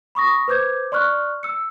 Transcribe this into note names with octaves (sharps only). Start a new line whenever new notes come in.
B5 C#6 D#6 A#6
B4 C5 D6 G6 G#6
D5 C6 C#6 F6 F#6
E6 C#7